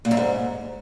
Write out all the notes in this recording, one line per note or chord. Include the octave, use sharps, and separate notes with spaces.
A#2
F#2
G#2